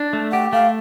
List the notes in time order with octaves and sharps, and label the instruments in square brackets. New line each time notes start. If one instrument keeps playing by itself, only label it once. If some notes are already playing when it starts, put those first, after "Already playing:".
Already playing: [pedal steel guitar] D4
A3
[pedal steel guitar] G4 [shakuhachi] F#5
[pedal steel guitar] A3 [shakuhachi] F5